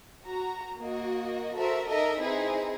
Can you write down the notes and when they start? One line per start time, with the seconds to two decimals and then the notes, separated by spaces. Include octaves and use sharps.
0.25 F#4 A#5
0.79 A#3 F#4 D#5
1.57 F#4 A4 A#4 C5 E5
1.88 D#4 A4 A#4 D#5 E5
2.18 C4 D#4 E4 G#4 B4 C5